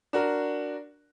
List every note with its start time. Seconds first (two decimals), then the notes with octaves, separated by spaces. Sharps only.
0.13 D4 F#4 A#4